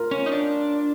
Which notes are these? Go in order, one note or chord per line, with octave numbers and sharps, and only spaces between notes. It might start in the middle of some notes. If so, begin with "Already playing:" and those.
Already playing: F4 A#4
C#4
D#4
D4